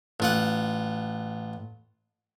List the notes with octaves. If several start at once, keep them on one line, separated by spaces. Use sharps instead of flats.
A1 F4 F#5